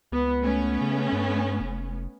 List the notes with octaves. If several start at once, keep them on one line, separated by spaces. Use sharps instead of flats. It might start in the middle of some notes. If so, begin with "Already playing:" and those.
C#2 B3
A3 B3 C#4
C#3
G2
F1